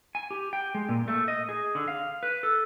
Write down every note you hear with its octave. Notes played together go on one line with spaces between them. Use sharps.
G#5
G4
G5
G#3
A#2
A3
D#5
G#4
D3
F5
B4
A4